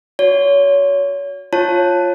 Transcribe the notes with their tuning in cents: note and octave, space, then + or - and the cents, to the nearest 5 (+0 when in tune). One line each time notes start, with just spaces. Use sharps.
F#4 -10 C#5 +30
F4 +0 C#5 -20 A5 +0